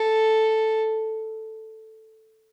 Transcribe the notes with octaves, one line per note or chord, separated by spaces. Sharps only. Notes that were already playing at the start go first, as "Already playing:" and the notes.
Already playing: A4